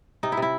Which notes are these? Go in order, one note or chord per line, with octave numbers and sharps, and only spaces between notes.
C3 D#4
E4
C3
E4